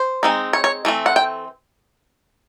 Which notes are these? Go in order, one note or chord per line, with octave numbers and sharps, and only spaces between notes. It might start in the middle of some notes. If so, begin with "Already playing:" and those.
Already playing: C5
G#3 C4 D#4
C#5
C#5
E3 A3 C4
F#5
G5